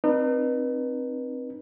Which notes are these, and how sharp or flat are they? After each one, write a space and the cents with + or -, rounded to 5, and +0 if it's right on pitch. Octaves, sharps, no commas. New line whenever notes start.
C4 +0 D#4 -40 B4 -30